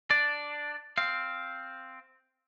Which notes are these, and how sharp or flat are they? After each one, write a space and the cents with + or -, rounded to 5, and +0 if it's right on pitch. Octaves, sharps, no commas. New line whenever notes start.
D4 +0 D5 +0
C4 +0 F5 +0